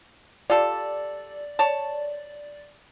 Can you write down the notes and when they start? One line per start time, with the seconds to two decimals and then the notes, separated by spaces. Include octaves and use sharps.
0.50 F4 G4 A4 D5
1.59 C#5 A5